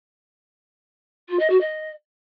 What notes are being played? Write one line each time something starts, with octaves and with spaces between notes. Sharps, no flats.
F4
D#5
F#4
D#5